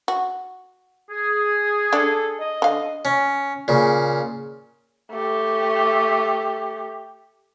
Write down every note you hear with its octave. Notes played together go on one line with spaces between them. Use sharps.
F#4
G#4
D4 A4 D5
D#5
D3 F5
C#4
A#2 C#3
A3 G4